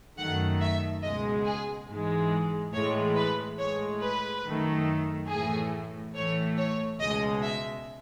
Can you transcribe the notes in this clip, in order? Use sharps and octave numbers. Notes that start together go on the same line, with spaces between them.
F#2 D#3 A3 F#5
E5
C#2 B2 G#3 D#5
G#4
G#2 E3 G#3
A2 E3 G#3 C#5
B4
A2 G#3 C#5
B4
F#2 D#3 A3
A2 E3 A3 G#4
A2 E3 A3 C#5
C#5
C#2 B2 G#3 D#5
E5